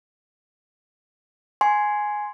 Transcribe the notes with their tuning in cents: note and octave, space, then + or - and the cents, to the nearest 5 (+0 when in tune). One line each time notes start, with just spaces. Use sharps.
G#5 +5 C6 +0